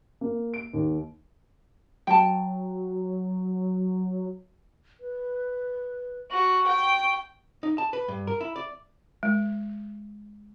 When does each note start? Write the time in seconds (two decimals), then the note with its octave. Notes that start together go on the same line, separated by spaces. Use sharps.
0.21 A#3
0.54 D7
0.73 D#2
2.07 F#3 G5 A5
5.00 B4
6.31 F#4 C#6
6.67 G5
7.63 D#4
7.78 A5
7.93 B4
8.08 G2
8.27 A#4
8.41 E4
8.56 D5
9.23 G#3